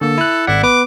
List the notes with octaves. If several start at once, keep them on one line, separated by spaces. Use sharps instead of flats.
D3 A#3 A4
E4 F#6
G#1 E4 D5 F#5
B3 B4 D6